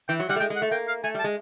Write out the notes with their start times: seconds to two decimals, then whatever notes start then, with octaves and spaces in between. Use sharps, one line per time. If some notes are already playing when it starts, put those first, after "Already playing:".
0.09 E3 G5
0.20 F#3
0.29 G3 F#5
0.36 A3
0.40 G#3 G5
0.50 G#3
0.56 F#5
0.62 A3
0.71 A#3 G5
0.88 F5
1.04 A3 G#5
1.14 G3
1.19 A5
1.24 G#3